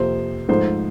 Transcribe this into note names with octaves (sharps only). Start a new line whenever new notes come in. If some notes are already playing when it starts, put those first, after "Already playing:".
Already playing: F2 C3 F3 A#3 C5
G#2 F3 A3 C5